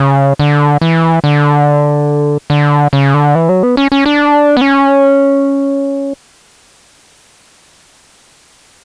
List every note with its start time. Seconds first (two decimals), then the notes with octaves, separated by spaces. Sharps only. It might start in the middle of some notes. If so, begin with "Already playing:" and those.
Already playing: C#3
0.39 D3
0.81 E3
1.24 D3
2.50 D3
2.93 C#3
3.14 D3
3.35 E3
3.49 F#3
3.63 B3
3.77 C#4
3.92 C#4
4.06 D4
4.57 B3
4.61 C#4